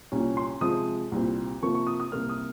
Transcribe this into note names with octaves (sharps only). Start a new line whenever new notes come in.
C2 A#2 G3 C#4
C6
C3 F3 G#3 D#6
C2 A#2 G3 C4
C3 F3 A#3 C#6
C#6
D#6
D#6
C2 C3 G3 A#3 F6
D#6